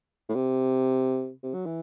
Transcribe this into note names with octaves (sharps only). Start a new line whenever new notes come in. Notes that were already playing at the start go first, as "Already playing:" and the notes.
A2
C3
C3
F#3
E3